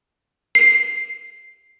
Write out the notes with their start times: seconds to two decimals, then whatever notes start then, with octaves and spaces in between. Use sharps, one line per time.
0.55 C7